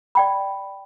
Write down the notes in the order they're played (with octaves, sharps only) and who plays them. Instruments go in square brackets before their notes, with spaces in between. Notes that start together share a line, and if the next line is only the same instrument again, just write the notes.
[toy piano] D5 G5 B5